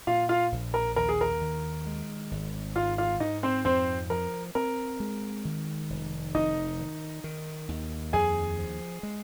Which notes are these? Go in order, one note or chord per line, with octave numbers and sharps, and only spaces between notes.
A#2 F4 F5
F4 F5
A#1
A#4
D#2 A#4
G#4
A#4
D#3
G#3
G#1
G#2 F4 F5
F4 F5
G#2 D#4 D#5
C4 C5
F2 C4 C5
F3 A#4
C4 A#4
G#3
D#3
F1
F1 D#4 D#5
D#3
D#3
D#2
F2 G#4 G#5
F3
G#3